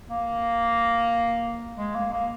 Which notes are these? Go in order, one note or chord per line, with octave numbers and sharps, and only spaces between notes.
A#3
G#3
A#3
A#3